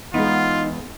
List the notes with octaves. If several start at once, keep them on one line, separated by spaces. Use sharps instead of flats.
E2 G#3 B3 D#4 F4